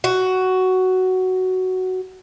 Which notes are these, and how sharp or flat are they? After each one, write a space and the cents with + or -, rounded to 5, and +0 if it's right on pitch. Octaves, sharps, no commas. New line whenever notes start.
F#4 +10